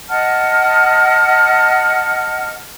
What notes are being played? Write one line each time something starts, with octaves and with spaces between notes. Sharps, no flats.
D#5 F#5 A5 F6